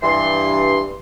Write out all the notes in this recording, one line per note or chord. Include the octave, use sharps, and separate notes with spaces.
G2 E3 C6